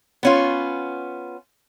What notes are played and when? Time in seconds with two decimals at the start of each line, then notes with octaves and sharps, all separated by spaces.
0.23 B3 C#4 F4